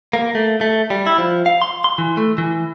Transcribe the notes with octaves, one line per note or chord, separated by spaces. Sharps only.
A#3
A3
A3
G3
E4
F3
F5
C6
C6
E3
A3
E3